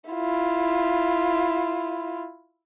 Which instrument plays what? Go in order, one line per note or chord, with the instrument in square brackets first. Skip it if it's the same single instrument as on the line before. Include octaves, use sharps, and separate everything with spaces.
[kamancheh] E4 F4